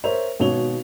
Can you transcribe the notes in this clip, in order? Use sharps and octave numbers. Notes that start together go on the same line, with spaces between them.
A#4 C5 C#5 E5 F7
G#1 B2 C#5 F7 G7